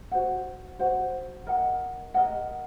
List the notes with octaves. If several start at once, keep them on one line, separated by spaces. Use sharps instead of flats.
F#4 C5 F#5
F#4 C5 F#5
A#4 D#5 F#5
A#4 D#5 F#5